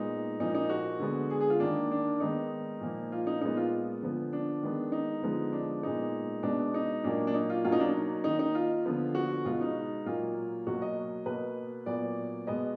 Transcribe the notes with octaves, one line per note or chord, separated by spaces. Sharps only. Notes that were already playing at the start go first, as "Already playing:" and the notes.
Already playing: A#2 G#3 B3 D#4
A#2 F3 A#3 D#4
D#4
F#4
D3 G#3 B3
G#4
G#4
F4
D#3 A#3 D4
D4
D#3 G#3 B3 D#4
A#2 F3 A#3
F4
D#4
A#2 G#3 B3 D#4
F4
D3 F3 B3
D4
D#3 G#3 B3
D#4
D3 F3 G#3 B3
D4
A#2 G#3 B3 D#4
B2 G#3 B3 D4
D#4
A#2 F#3 A#3 D4
D4
D#4
F4
B2 F#3 A#3 F4
D#4
D4
D#4
D#3 A#3 D#4
D#4
F4
D3 F3 B3
F#4
B2 G#3 B3 F4
D#4
A#2 F#3 A#3 F4
B2 F#3 A#3 F#4
D#5
B2 A#3 B4
A#2 F#3 B3 D5
B2 G#3 B3 D#5